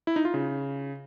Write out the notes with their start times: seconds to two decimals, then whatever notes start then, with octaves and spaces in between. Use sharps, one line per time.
0.07 E4
0.16 D#4
0.25 F4
0.34 C#3